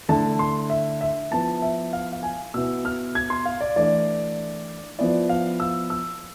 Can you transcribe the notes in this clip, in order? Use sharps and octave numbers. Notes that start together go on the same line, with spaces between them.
D3 A3 E4 A5
C6
E5
E5
F3 B3 E4 A5
E5
F5
F5
G#5
B2 B3 E4 E6
F6
G#6
C6
F5
D5
E3 A3 D4 D5
F3 B3 E4 D5
F5
E6
E6